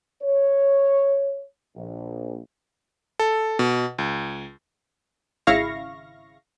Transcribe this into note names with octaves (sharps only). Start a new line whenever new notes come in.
C#5
A#1
A4
B2
C#2
G#1 C#3 E4 F5 C#6 A#6